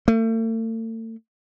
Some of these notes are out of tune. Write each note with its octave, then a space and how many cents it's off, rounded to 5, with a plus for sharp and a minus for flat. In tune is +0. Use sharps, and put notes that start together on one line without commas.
A3 +40